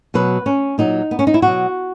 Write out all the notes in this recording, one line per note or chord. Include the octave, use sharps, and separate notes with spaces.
B2 F#3 B4
C#4
A#2 F#3 D#4
B3
C#4
D#4
E4
B2 F#3 F#4